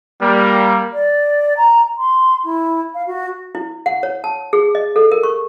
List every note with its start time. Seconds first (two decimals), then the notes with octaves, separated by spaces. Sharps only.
0.21 G3 A#3
0.93 D5
1.57 A#5
1.98 C6
2.45 E4
2.94 F5
3.07 F#4
3.55 E4
3.86 F#5
4.03 C#5
4.24 A5
4.53 G#4
4.75 D#5
4.96 A4
5.12 A#4
5.23 C#6